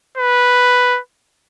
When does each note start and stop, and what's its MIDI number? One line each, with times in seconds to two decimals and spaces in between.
0.18 0.99 71